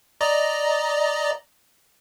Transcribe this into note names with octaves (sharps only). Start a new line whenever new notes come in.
D5 D#5 A#5